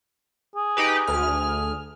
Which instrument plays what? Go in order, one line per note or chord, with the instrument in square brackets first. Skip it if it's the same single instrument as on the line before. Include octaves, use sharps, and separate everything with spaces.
[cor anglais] G#4
[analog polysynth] D#4 G4 B4
D2 F6